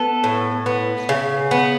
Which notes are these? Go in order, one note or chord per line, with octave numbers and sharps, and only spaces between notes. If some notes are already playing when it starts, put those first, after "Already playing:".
Already playing: B3 A4
A2
B3
C#3
B3